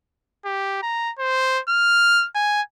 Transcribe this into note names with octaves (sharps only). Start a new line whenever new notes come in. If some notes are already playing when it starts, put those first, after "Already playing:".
G4
A#5
C5
F6
G#5